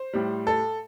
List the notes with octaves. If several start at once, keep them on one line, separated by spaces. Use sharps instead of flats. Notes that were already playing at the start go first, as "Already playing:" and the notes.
Already playing: C5
A2 G3
A4